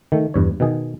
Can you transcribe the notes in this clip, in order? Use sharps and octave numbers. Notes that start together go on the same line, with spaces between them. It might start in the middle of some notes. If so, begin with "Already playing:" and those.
D#3 A3
E2 G2 C#5
B2 D#3 G#4